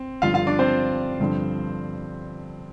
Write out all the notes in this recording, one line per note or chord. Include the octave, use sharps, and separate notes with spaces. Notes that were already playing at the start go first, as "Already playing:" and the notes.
Already playing: C4
G1 G2 D3 F3 F4 F5
F4 F5
D4 D5
C4 C5
G1 G2 D3 F3